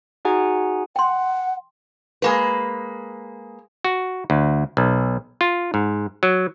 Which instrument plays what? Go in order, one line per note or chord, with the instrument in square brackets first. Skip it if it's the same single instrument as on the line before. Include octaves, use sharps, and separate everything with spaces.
[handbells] D#4 F#4 G#4 F#5 G#5 A#5
[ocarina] F#5 [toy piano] G5 C6
[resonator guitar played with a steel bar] G#3 A#3 B4
[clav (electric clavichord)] F#4
D2
B1
F4
G#2
F#3